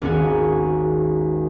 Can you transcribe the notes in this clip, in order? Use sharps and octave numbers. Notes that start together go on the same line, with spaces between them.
G#1 D#2 C#4 D#4 F#4 G#5